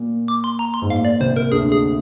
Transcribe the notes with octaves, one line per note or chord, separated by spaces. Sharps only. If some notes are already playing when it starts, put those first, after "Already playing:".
Already playing: A#2
D6
C6
A#5
C6
G#2
A#2 F5
D5
C2 C3 C5
A#4
D2 D3 G#4
G#4